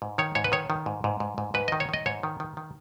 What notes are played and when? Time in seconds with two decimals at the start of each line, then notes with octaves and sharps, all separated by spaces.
0.02 G#2
0.18 D#3 C#5
0.35 G#2 C#5
0.44 B4
0.52 D#3 C#5
0.70 D#3
0.86 G#2
1.04 G#2
1.20 G#2
1.38 G#2
1.54 G#2 B4
1.68 D#3 D#5
1.80 C#5
1.89 D#3 D#5
2.06 G#2 C#5
2.23 D#3
2.40 D#3
2.57 D#3